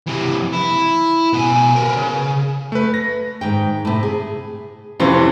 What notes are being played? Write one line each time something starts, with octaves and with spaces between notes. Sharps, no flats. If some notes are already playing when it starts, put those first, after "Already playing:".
C3 E3
E4
B2 G#5
A#4 B4
C#3
A3 B4
A#6
G#2 D#3 G5
A2 C3
G#4
F2 C3 E3 C#4 F4 C5